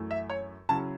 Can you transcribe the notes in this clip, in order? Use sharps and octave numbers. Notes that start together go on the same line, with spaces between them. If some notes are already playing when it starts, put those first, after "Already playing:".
Already playing: F#2 E3 A3
E5
C#5
C#3 F#3 C#4 E4 A5